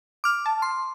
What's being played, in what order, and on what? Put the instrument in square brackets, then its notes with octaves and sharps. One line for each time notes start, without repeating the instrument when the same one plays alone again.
[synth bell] D6 F6
[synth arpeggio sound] A5
[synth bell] C6